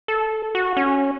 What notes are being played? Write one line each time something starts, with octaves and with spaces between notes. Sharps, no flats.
A4
F#4
C#4